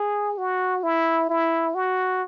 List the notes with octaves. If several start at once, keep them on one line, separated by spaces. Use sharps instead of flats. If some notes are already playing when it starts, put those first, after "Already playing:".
Already playing: G#4
F#4
E4
E4
F#4